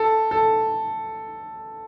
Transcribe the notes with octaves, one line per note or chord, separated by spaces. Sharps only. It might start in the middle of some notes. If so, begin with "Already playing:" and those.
Already playing: A4
A4